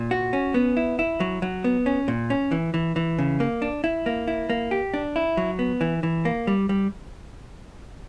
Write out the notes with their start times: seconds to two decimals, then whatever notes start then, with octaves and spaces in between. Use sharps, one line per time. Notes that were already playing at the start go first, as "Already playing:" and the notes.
Already playing: A#2
0.11 F#4
0.33 C#4
0.54 B3
0.77 E4
0.99 E4
1.20 F#3
1.42 F#3
1.64 B3
1.86 C#4
2.08 A#2
2.30 C#4
2.52 E3
2.74 E3
2.96 E3
3.18 C#3
3.40 A#3
3.62 D4
3.84 E4
4.06 A#3
4.28 E4
4.50 A#3
4.71 G4
4.94 D4
5.16 E4
5.37 F#3
5.59 B3
5.81 E3
6.03 E3
6.25 A#3
6.47 G3
6.69 G3